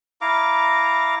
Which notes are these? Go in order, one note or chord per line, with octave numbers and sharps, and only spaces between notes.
E4 F5 A#5 D6